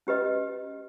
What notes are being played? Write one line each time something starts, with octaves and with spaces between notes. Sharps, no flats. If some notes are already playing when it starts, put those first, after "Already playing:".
C#4 G4 B4 D#5